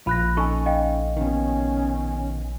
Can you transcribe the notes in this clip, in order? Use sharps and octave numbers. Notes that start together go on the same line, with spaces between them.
A#1 F4 B5 F#6 A#6
C#4 D#4 A4 G#5 C#6
D#5 F5 G5
B2 D#3 C#4